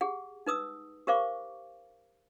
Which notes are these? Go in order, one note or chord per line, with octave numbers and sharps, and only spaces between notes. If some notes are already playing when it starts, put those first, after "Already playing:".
G4 G#4 F#5
D#4 B4 D#6 E6
G4 A#4 C5 F5 C#6 D6